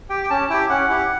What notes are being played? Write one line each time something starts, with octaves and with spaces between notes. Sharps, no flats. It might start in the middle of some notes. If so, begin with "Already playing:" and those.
G4 G5
G5
C#4 A5
E4 G4 G5
C#4 F#5
E4 G4